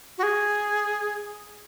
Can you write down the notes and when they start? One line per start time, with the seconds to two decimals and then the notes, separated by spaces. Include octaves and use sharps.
0.18 F#4
0.23 G#4